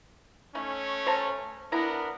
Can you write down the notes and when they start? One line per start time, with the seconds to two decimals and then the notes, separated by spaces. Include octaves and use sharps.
0.55 A3 C#4 D#4
1.06 C5 A5 A#5
1.72 B3 D4 E4 A#4 A#5